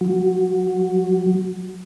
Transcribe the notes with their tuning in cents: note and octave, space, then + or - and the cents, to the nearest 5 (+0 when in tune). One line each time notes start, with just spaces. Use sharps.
F#3 +0